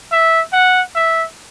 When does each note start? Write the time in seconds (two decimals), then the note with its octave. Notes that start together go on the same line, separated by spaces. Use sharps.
0.12 E5
0.53 F#5
0.95 E5